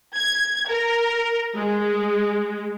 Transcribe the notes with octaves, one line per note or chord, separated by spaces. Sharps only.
G#6
A#4
G#3